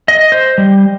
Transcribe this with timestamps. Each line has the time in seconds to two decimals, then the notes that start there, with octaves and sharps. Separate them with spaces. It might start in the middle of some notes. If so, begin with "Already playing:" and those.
0.08 D#5
0.32 C5
0.58 G3